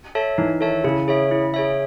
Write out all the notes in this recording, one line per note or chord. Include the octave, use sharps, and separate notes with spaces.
A4 C#5 E5 A5
E3 D#4
D#3 A4 C#5 E5 A5
C#3 E4
G#4 C#5 E5
E4
G#4 C#5 E5